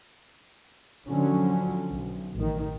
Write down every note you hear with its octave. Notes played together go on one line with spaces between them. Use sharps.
D3 F3 F#3 C#4
B1
A1 D#3